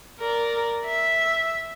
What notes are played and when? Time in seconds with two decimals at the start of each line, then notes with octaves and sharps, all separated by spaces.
0.20 A#4 D5
0.86 E5